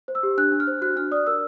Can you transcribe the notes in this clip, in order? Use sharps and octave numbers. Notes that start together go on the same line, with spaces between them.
C5
E6
G4
D4 F#6
D4
F6
C5
F#4 F#6
D4 F6
D5 D#6
A#4 E6